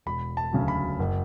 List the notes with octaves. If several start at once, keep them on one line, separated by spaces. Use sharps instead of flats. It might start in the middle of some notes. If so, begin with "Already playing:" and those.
E1 B5
A5
D2 C#3 F#3
B5
F#1